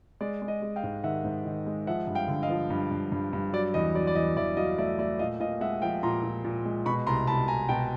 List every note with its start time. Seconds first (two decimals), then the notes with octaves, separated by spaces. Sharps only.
0.21 G#3 D5
0.42 G#3
0.48 D#5
0.62 G#3
0.76 F5 G5
0.83 G#2
1.04 D#3 E5 F#5
1.24 G#2
1.45 D#3
1.66 G#3
1.87 F3 E5 F#5
2.07 G2
2.15 F5 G5
2.28 D3
2.42 D#5 F5
2.49 F3
2.70 G2
2.91 G2
3.12 G2
3.33 G2
3.53 F#3 D5
3.74 E2 D#5
3.94 F#3 D5
4.07 D5
4.16 E2 D#5
4.37 E2 D5 E5
4.57 F#3 D#5 F5
4.78 A3 D5 E5
4.99 A3 D5 E5
5.19 A#2 D#5 F5
5.40 A#2 D#5 F5
5.61 G#3 E5 F#5
5.82 F3 F5 G5
6.03 A#2 A#5 C6
6.23 A#2
6.44 A#2
6.65 G#3
6.86 B2 B5 C#6
7.07 C2 A#5 C6
7.27 C2 A5 B5
7.48 C2 G#5 A#5
7.69 B2 G5 A5